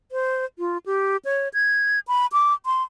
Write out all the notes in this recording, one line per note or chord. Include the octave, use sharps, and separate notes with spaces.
C5
F4
G4
C#5
G#6
B5
D6
C6